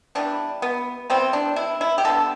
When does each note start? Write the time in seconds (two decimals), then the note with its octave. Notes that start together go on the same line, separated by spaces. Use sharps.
0.15 E3 G3 B3 D4
0.62 B3
1.10 E3 G3 B3 C4
1.33 D4
1.56 E4
1.81 E4
1.98 G4
2.04 D3 G3 B3 A4